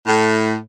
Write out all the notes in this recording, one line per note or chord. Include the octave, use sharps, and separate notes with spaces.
A2